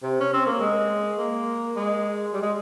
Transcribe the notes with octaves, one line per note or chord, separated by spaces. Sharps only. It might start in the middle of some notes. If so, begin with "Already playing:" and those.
C3
C#4
C4
A#3
G#3
A#3
G#3
G3
G#3